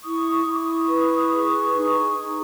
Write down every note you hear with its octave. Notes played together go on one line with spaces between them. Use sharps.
E4 C#6 D#6
E4 D#6
D6
C#6 D#6
B4
G#4
D#4
D#4